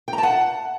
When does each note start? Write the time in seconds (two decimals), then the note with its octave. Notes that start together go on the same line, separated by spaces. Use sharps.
0.08 G5
0.13 A#5
0.18 A5
0.23 F#5